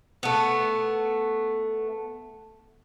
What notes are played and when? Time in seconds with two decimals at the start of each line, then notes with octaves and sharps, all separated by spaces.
0.23 A3 B3